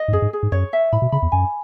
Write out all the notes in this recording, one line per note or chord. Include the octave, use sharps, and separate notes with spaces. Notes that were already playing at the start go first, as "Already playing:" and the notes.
Already playing: D#5
G#2
F#2 G#4
G#2
G#4
G#2
F#2 C#5
E5
A2 B5
B2
C#3 B5
E2
F#2 G#5